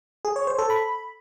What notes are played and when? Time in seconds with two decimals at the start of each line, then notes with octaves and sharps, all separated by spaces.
0.25 G#4
0.36 C#5
0.47 C5
0.58 A4
0.70 B5